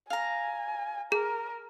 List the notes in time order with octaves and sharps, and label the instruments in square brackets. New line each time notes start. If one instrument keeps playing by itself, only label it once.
[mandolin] F5 A#5 [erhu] G#5
[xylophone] G#4 [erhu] A#4